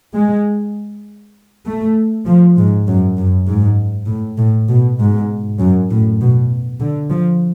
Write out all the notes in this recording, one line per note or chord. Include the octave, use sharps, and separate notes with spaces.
G#3
A3
F3
G#2
F#2
F#2
G#2
A2
A2
B2
G#2
F#2
A2
B2
D3
F3